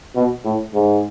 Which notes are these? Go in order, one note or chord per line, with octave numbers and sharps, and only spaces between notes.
B2
A2
G#2